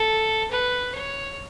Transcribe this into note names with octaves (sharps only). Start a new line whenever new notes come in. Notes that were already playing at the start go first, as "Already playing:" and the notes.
Already playing: A4
B4
C#5